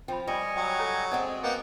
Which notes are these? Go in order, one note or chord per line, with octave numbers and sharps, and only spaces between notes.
F3 C4 F4 G5 B5
G3 B4 D5 D#5 G#5 C#6
F#3 D5 G5
A4 C#5 A#5
G#3 C4 G#4 D5 D#5 F#5
A#3 B3 D#5 F#5 G5 D6